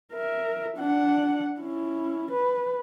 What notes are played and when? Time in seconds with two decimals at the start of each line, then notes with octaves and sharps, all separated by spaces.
0.13 A#4 E5
0.77 D4 F#5
1.60 C#4 E4
2.31 B4